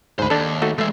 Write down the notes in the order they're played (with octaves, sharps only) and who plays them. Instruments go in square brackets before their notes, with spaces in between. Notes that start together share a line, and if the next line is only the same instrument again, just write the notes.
[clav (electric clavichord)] D2 G#2 [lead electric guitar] C5 B5
[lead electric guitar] D#2 [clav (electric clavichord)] D4 A4
[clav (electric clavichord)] A3 D#4 F#4
[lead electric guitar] E3 G#3 [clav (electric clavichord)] A3 E5